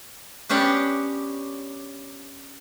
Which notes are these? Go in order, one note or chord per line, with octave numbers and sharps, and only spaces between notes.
B3 C#4 D4 G4 C#5 F#5